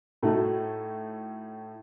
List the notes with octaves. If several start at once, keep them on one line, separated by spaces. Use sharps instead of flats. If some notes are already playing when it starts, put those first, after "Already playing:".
A2 A3 D#4 F#4 A4